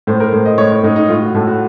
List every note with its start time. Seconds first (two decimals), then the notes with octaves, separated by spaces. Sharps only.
0.07 A2 C5
0.20 A#4
0.33 A2 C5
0.46 D#5
0.58 A2 C#5
0.71 C#5
0.83 A2 D#4
0.96 D#4
1.09 A2 F4
1.22 F#4
1.34 A2 A4
1.47 F#4